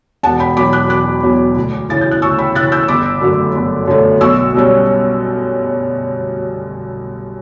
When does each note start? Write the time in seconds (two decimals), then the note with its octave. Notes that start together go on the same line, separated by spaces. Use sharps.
0.23 E1 F#5 A5
0.39 G5 B5
0.56 E2 B2 F#3 B5 D6
0.73 D6 F#6
0.89 E1 D6 F#6
1.23 E2 B2 F#3
1.56 D2
1.89 C#3 E3 A6
2.01 G6
2.11 F#6
2.22 D2 C#6 E6
2.38 G5 B5
2.55 C#3 E3 F#6 A6
2.72 E6 G6
2.88 G1 B5 D6
3.21 F#2 D3 F#3 A3
3.55 G1
3.88 F#2 D3 F#3 A3
4.21 B1 C#6 E6
4.54 B2 G3 C#4